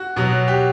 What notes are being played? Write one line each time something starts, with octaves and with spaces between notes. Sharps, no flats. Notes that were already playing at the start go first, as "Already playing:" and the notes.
Already playing: F#4
B2 F#3
G4